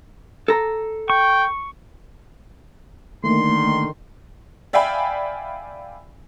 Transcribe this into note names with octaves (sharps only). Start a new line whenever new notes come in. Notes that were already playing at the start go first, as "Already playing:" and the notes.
A4 A#5
G5 C#6
D3 D#3 A3 A#3 C6
D5 E5 F5 G5 G#5 B5